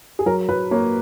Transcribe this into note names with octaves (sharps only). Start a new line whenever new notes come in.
G#4
F#3 A#4
F#3 B4
A#3 C#5